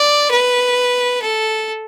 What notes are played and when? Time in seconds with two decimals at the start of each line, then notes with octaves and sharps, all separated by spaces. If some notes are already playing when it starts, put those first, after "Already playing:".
Already playing: D5
0.31 B4
1.22 A4